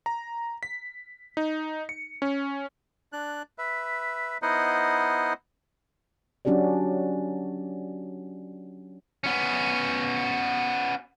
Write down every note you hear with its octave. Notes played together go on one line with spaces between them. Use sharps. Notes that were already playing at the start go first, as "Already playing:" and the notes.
A#5
B6
D#4
C#7
C#4
D4 F#6
B4 E5
B3 D#4 E4 C5 D#5 F#5
F#3 C#4 D4 F#4 G4 D5
B3 C#4